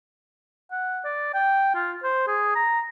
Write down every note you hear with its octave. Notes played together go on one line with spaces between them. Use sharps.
F#5
D5
G5
F4
C5
G#4
A#5